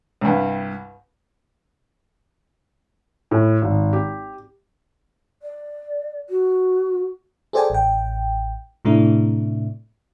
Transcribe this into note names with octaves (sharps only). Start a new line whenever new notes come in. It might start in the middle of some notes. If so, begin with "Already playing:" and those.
C2 G2
A2
G#1
G4
D5
F#4
G#4 A4 C5 D5 G5 G#5
A1 G5
A2 C3 A3 D4 E4